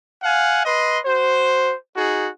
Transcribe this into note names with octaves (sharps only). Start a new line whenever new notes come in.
F5 F#5 G#5
B4 D#5 C6
F#4 C5
D#4 F#4 G#4